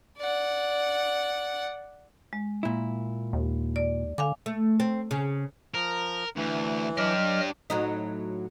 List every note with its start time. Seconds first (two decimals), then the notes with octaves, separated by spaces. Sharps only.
0.18 D5 F#5
2.33 G#3
2.63 A#2 E4
3.33 D#2
3.76 D5
4.18 D3 F5 G#5 D6
4.46 A3
4.80 C4
5.11 C#3
5.74 F3 A#4
6.36 D2 E3
6.97 F#3 D4 G4 D#5 F6
7.70 A2 F#3 D#4